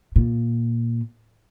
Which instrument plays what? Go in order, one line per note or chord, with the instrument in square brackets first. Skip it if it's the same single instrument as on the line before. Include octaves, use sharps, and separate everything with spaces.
[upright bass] A#2